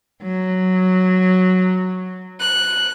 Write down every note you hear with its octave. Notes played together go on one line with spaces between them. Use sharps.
F#3
F#6